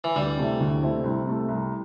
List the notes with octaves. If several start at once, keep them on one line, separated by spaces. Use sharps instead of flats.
E3
D2 G3
C3 A3 C4 E4
D2
C3 A3 C4 E4
C2
C3 A3
C2